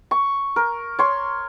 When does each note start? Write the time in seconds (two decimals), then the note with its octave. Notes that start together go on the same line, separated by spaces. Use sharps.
0.11 C#6
0.56 A#4
0.99 C#5 C6